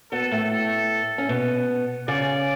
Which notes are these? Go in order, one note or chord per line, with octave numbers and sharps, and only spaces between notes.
B2 B3 A4
A2 A3
A4
C#4
B2 B3
C#3 C#4 D5